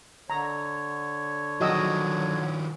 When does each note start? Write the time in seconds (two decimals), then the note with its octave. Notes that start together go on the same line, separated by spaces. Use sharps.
0.30 D3 C#5 A#5
1.61 D#3 F3 F#3 F#4 D#5 E6